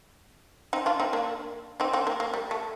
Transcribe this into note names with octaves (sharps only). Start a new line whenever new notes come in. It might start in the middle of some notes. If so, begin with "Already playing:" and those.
C4 D#4
D4 F4
C4 D#4
A#3 D4
C4 D#4
C4 D#4
A#3
A#3
G3
A3